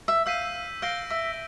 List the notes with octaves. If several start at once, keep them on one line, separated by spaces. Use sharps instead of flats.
E5
F5 E6 G6 B6 D#7
F5 G6 A#6 D7 G7
E5